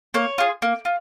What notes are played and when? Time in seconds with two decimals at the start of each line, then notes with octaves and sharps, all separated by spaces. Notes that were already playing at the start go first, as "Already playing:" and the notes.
0.14 A#3 C#5
0.38 F4 G#4
0.62 A#3
0.85 F4